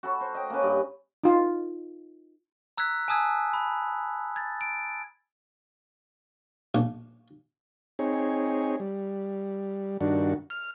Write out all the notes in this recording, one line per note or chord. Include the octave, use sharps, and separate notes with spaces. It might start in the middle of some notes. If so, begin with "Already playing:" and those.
F#4 A4 B5
C5
D#5 G5
A#3 C#4 B4
G2
D#4 F4
A#5 E6 F#6 G#6 B6
G#5 A5 D#6 E6 G#6
B5
G#6 A6
D7
A#1
C4 D#4 G#4 C#5
G3
G2 D#3 D4 F#4
F6